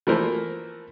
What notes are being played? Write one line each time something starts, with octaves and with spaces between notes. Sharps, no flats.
E3 F3 A3 A#3 A#4 C5